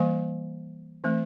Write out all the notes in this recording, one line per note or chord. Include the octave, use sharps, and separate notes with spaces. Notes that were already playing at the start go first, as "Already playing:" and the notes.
Already playing: E3 G3 A#3 G#5
E3 A3 C4